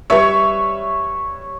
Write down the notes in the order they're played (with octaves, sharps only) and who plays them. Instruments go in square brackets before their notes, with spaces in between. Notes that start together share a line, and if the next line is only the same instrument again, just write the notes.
[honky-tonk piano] G3 B4 E5 [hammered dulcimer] C#5 C#6